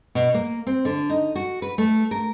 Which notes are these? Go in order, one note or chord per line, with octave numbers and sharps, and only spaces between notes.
B2
A#3
C4
D3
D#4
F#4
B4
A3
A#4